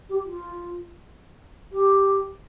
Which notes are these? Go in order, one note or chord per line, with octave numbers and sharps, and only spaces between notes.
G4
F4
G4